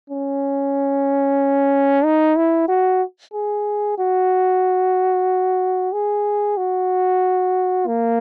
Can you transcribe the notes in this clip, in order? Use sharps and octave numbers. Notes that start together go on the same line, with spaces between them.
C#4
D#4
E4
F#4
G#4
F#4
G#4
F#4
A#3